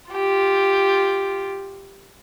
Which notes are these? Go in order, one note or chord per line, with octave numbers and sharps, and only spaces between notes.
F4 G4